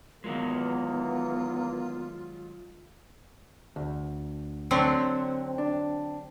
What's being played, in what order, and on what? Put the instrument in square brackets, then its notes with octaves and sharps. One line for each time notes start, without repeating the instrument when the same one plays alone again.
[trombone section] E2 A#3 [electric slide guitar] D#3 F#3 G#3 [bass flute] B3 [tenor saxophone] F4
[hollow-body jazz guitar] D2
[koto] D3 F#3 C4
[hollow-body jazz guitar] D4